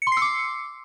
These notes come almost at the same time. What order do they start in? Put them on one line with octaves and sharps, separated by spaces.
C#7 C6 C7 E6 D6